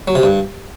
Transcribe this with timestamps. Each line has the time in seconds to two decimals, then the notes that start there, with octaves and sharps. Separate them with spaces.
0.08 F#3
0.15 C3
0.23 G2